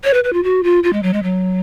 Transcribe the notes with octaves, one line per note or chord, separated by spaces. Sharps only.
C#5
B4
B4
F4
F#4
F4
F4
G#3
F#3
G#3
F#3